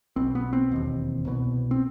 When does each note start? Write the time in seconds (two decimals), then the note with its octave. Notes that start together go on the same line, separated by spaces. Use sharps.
0.16 B1 B2 C4
0.35 B3
0.53 C4
0.72 E1 D#2
1.26 C2 B2
1.71 C4